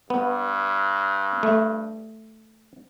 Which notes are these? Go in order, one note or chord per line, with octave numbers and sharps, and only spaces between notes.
G2 B3
A3